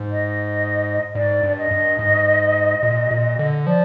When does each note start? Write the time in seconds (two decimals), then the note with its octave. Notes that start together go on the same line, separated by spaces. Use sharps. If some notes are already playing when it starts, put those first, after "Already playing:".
Already playing: G#2
0.10 D#5
1.15 G#2 D5
1.43 G2
1.58 D#5
1.71 G2
1.99 G#2
2.83 A#2
3.11 A#2
3.39 D3
3.67 F3 D5